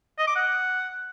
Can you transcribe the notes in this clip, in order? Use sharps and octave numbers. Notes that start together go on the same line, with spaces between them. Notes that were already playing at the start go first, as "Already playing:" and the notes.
D#5
D6
F#5